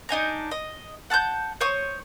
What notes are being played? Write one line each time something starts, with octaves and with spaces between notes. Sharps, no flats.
D4 D#4 G#5 A#5
D#5
F#5 A5 F6 G6
C5 C#5 C#6 D#6